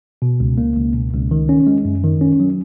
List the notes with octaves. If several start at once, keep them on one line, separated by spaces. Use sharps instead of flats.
B2
C#2
A#3
C#2
B2
C#2
D#3
C#4
G#3
F#2
D#3
C#4
F#3